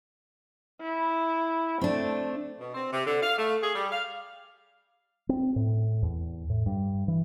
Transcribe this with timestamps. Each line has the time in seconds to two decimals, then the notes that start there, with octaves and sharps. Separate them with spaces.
0.82 E4
1.81 A3 C4 D4
2.59 B2
2.75 C4
2.91 C3
3.06 D3
3.21 F5
3.38 A3
3.62 G#4
3.75 G3
3.91 F5
5.29 C4
5.56 A2
6.02 E2
6.50 A2
6.66 G2
7.08 E3